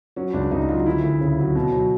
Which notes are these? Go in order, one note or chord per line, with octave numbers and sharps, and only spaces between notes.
F#3 C#4
C#2 D4
C#2 D#4
F#3 F4
D2 E4
D2
C#3
F#3
B2
F#3